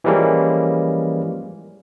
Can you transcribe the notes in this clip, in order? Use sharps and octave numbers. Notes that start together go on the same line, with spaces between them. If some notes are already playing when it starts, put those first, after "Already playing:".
E3 F3 G3 G#3 A#3 C#4